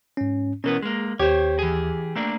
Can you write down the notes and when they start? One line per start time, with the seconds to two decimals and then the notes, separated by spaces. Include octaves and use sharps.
0.17 G#2 C#4
0.64 B2 E3 B3 C#4 A#4
0.82 G#3 A#3 G#4
1.19 D#2 G4 C5 C#5
1.59 E3 G#4
2.15 A3 A#3 D4